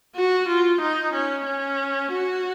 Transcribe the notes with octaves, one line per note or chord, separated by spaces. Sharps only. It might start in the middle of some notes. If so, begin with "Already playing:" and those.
F#4
F4
D#4
C#4
C#4
F#4